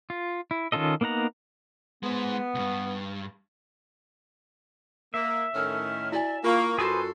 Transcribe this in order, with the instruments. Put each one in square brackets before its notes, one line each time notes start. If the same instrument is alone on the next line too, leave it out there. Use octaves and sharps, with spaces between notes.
[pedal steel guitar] F4
E4
D#3 C#4 F4 A4 D#5
A#3 B3 D#4 F#5 A#5
[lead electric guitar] G#3 C5 [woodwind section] B3
[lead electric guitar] C#2 G2
[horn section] A#3 [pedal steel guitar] E5
[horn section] A2 D#3 C#4 [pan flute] F6
[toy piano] E4 F#4 G#5 [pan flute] D5
[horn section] A#3 [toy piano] F4 [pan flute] C#6
[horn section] F#2 A4 C6 [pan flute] F#4 [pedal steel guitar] G#4 B4 C5